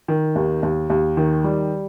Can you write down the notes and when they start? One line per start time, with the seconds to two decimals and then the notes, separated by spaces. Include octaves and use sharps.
0.08 D#3
0.36 D#2
0.63 D#2
0.90 D#2
1.17 D#3
1.44 G3